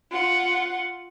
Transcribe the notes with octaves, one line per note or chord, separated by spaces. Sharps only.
F4 F#5